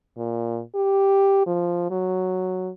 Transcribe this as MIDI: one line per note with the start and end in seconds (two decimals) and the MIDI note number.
0.17 0.61 46
0.75 1.44 67
1.47 1.88 53
1.90 2.70 54